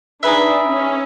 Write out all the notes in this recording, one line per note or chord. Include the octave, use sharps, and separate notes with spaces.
D4 D#4 G#4 B4 E5
C#4